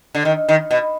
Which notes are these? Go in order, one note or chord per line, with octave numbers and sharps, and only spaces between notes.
D3
D#3
D#3
B2